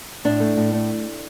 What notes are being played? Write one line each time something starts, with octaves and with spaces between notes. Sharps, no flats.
A2 D4
A3
A2
A3